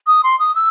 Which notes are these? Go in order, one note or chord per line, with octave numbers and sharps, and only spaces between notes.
D#6
C6
D#6
E6